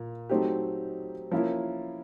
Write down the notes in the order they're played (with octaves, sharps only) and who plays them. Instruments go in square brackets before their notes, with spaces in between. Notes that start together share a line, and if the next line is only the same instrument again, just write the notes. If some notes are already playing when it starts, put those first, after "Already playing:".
Already playing: [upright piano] A#2
F#3 A3 C4 D#4 G4
F3 A#3 C#4 E4